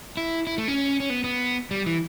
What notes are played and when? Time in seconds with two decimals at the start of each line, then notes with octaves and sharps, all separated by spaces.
0.17 E4
0.47 E4
0.58 A3
0.68 C#4
1.00 C#4
1.10 B3
1.24 B3
1.71 G3
1.86 E3